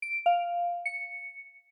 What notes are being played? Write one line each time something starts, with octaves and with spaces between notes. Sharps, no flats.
D7
F5
C#7